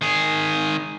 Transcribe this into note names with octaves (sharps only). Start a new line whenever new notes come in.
D#3 G#4